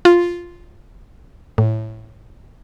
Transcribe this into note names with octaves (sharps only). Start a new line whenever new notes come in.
F4
A2